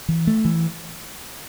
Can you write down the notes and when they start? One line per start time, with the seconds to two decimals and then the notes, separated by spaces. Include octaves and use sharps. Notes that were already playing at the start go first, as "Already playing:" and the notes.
0.09 E3
0.27 A3
0.45 E3